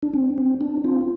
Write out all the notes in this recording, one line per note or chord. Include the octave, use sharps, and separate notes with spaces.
D4
C4
C4
D4
C4 F4